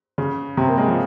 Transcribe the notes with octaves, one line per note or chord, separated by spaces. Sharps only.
C#3
C3
A#3
G#3
F3